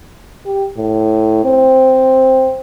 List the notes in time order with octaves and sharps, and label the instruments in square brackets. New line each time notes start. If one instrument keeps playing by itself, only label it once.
[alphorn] G4
A2
C4